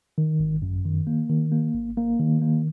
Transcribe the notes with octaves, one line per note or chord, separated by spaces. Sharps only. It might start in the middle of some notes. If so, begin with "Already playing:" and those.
D#3
G#1
F#2
D#3
A#3
D#3
A#3
G#1
A#3
D#3
A#3